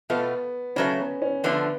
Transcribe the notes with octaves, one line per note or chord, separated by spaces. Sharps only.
B2 A3 B3 F4
C#3 F#3 A3 C#4
B3
C#4
D3 F3 A3 B3